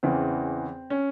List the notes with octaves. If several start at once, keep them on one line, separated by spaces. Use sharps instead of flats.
E2 C#3 E3 C4
C#4